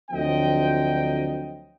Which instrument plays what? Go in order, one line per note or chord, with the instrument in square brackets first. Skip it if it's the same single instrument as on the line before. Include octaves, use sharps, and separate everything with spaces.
[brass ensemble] D2 F3 F#3 C4 D#5 G5